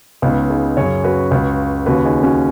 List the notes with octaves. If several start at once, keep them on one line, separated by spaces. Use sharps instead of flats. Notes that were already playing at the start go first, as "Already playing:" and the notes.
C#2 C#3 B3 D#4
D#4 G#4
F#2 C#3 G#4 C#5
F#4 B4
C#2 C#3
D#2 C#3 F#4 B4
D#4 G#4
C#4 F#4